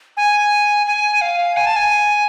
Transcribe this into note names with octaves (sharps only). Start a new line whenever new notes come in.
G#5
G#5
F5
G#5
A5
G#5